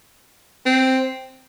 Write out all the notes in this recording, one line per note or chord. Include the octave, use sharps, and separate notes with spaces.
C4